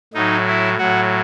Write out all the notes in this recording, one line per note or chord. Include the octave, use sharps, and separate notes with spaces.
A2 F#3 D#4
E4
A2 F#3 F#4